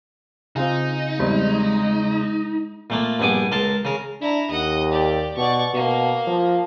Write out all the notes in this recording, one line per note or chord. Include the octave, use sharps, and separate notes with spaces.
C#3 C4 D#4 F4 G#4
E2 G3 G#3 C4
A#2 A3 A#3
A#1 G2 B3 G#5 D6
C#2 A#4 A5 C6
C#3 A#4
D4 E4 A#5
D#2 D#5 F#5
G4 D5
B2 D5 C#6
B2 A#3
F3